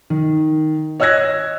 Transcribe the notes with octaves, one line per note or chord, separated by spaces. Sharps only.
D#3
C#5 D#5 E6 F#6 G#6 A#6